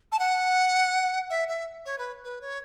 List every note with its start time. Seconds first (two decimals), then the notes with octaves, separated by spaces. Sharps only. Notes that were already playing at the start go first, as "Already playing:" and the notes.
0.12 A5
0.19 F#5
1.30 E5
1.48 E5
1.86 C#5
1.98 B4
2.24 B4
2.41 C#5